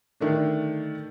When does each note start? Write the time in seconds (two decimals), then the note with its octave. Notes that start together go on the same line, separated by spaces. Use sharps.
0.20 D3 D#3 A3 D4